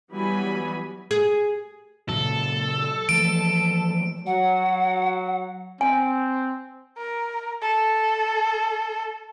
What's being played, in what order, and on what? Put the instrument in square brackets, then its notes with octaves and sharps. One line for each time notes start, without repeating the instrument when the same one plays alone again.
[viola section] E3 F#3 G3 B3 G#5 B5
[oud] G#4
[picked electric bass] A#2 C#3 F#3 [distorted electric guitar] A4
[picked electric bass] E3 F3 A3 [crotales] D7
[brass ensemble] F#3 [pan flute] F#5
[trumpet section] C4 [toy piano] G#5
[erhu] A#4
A4